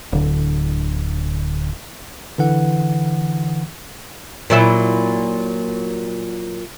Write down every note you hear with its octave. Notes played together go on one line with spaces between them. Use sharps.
D1 D3
D3 E3 F#5
A#2 F#3 E4